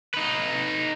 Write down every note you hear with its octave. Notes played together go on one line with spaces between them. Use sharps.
D#4 B4